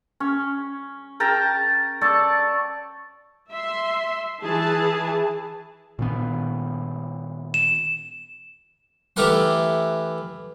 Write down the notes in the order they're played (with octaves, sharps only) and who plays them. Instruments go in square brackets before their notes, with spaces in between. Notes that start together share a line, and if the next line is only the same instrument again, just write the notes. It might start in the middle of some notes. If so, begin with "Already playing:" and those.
[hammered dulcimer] C#4
A#4 G5 A5 A#5
A4 C#5 D5 A5
[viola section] E5 C6
E3 G#4 A5
[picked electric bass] A#2 D#3 B3
[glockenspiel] E7
[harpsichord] E3 A3 G4 A#4 F#5 C6